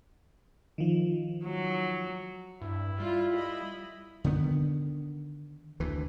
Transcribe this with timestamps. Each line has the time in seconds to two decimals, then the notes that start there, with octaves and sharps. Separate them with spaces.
0.78 D#3 F3
1.44 F#3
2.62 G2 E4
3.00 G3 F4
3.35 D#5 B5
4.24 D3 D#3 B3
5.80 D2 E3